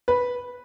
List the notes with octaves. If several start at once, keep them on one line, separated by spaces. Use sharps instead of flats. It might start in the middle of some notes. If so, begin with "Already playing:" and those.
B4